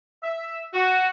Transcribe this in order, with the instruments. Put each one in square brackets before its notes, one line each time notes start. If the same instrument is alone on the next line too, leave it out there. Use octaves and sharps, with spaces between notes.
[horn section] E5
F#4